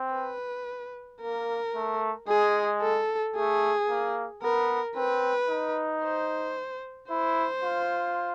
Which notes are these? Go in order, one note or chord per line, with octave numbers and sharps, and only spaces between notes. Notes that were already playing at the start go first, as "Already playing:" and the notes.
Already playing: C4
B4
A#3 A#4
A3
G#3 G#4
A4
A3 G#4
A#3
B3 A#4
C4 B4
D#4
C5
E4 C5
F4